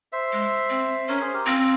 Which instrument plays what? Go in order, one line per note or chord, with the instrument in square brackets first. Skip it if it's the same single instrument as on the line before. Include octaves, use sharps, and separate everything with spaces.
[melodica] C5 E5
[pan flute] G#3
C4
[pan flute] C#4 [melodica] A#4 C#5
[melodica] G#4 C5
G4 A#4
[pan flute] C4 [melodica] F4